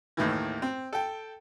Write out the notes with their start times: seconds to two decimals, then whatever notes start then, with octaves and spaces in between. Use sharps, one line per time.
0.17 D#2 A2 D#3 E3
0.62 C4
0.93 A4 G5